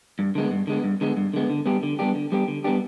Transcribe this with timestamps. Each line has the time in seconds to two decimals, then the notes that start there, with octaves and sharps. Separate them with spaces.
0.19 G2
0.35 D3 G#3 B3
0.51 G2
0.67 D3 G#3 B3
0.84 G2
1.01 D3 G#3 B3
1.17 G2
1.33 D3 G#3 B3
1.50 D3
1.66 G3 B3 D4 G4
1.83 D3
1.99 G3 B3 D4 G4
2.15 D3
2.32 G3 B3 D4 G4
2.48 D3
2.64 G3 B3 D4 G4